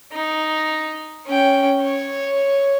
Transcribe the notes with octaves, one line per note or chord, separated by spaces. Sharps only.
D#4
C#4 G5
C#5